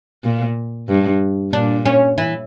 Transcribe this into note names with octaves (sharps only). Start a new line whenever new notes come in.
A#2
G2
A#2 D4
C#4
E3